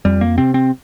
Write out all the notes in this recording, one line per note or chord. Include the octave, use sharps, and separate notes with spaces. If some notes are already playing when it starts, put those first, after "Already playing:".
F2 G3
A#3
C3 C4
C4